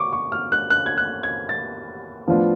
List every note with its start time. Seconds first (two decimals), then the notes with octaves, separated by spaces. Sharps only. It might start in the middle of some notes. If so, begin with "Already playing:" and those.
Already playing: C#6 D6
0.12 C#6
0.32 F6
0.52 F#6
0.70 F#6
0.86 G#6
0.98 F#6
1.23 G#6
1.49 A6
2.28 A2 F3 B3 D4 F4